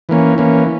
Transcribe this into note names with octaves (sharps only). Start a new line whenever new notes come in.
E3 A#3 C#4
E3 A#3 C#4